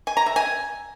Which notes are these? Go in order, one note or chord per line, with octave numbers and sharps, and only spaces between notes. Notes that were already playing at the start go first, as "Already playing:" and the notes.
G#5
A#5
E5
G#5